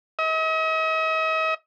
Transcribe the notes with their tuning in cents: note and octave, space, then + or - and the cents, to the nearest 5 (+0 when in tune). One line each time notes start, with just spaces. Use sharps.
D#5 +45